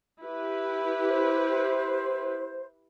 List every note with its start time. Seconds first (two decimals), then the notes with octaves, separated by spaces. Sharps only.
0.22 E4 G4 B4
1.09 C5